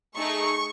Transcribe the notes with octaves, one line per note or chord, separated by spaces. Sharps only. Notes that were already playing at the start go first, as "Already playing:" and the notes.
A3 D#4 G#4 C#6